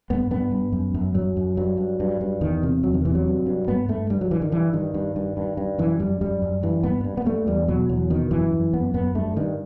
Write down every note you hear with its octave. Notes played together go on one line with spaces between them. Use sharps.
G2 B3
G2 B3
G2
F#2
F#2
F#2 F#3
F#2
G2 F#3
G2
G2
G2
E2 D#3
C3
E2 F#3
D#3
C3 E3
F#3
G2
G2
G2 B3
G2 A3
G2 G3
F#3
G2 E3
D#3
G2 E3
G2 D#3
G2
G2
G2
G2
F#2 E3
F#2 G3
F#2 G3
F#2
G2 E3
G2 B3
G2
B3
G2 A3
E2 G3
B2 F#3
E2 F#3
B2 D#3
F#2 E3
F#2
F#2 B3
F#2 B3
G2 A3
G2 D#3